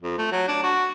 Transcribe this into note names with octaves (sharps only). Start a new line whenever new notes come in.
F2
A3
F#3
D4
F#4